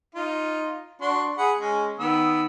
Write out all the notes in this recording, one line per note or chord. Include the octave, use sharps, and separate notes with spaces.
D#4 F4
D4 F#4 C6
G#4 F#5 B5
G#3 C#4
D#3 B3 E6